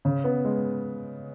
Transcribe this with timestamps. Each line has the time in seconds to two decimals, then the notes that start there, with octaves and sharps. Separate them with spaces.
0.05 C#3
0.24 B3
0.45 G#3